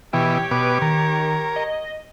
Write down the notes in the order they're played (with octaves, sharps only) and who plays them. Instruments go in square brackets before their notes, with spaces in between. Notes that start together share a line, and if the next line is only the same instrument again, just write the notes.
[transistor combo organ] B2 E3 [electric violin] G4 C#5 [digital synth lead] G5
[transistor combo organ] B2 D6 [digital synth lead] B4
[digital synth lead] D#3 [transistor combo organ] A#4
[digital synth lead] D#5